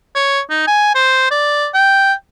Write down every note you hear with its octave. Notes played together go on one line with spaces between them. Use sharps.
C#5
D#4
G#5
C5
D5
G5